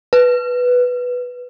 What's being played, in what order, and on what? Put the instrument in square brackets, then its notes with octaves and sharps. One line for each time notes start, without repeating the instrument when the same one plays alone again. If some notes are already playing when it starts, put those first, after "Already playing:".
[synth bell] B4